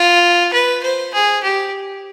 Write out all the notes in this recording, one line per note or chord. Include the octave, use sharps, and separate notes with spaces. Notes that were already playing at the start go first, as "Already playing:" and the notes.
Already playing: F4
B4
C5
G#4
G4